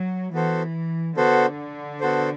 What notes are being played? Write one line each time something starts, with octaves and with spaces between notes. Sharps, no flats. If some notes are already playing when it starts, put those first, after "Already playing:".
Already playing: F#3
E3 B3 F#4 A4 C5
D3 B3 F#4 A4 C5
B3 F#4 A4 C5